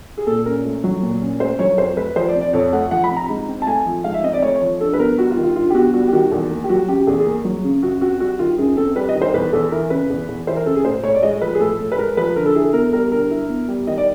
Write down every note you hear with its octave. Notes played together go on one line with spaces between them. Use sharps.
G#4
A#2 A4
C#4 A#4
A3
F#3
A#2
C#4
A3 C5
F#3 C#5
F2 C5
A3 B4
F3 C5
D5
C3
D5
F2 C#5
A3 F#5
F3 F#5
B5
C3
A#5
G#2
C4
A5
A3 G#5
F3
G#2 F5
E5
C4 D#5
D5
A3 C#5
C#5
F3
G2 A4
B4
B3 A#4
G3 F#4
F4
D#3
F4
G2 F4
G4
B3 F#4
G3 F#4
G4
D#3 F#4
E2
A#3
G4
F#3 F#4
C#3 G4
E2 G#4
G#4
A#3
F#3
C#3
F#2 F#4
C4 F#4
G3 F#4
D#3 F4
F#2 G#4
C4 A4
G3 B4
D#5
D#3
C5
E2 B4
E2 A4
E3 A#4
C#3 B4
E2
E2
E3 C5
A#4
C#3 A4
G#4
A2 C5
A2 C#5
D5
G#3 D#5
F3 B4
G#4
A2 A4
A2
B4
G#3 A#4
F3 B4
D3 A#4
A4
E4 G#4
A4
B3 A#4
G3 A#4
D3 A#4
E4
B3
G3
D#3 D#5
D5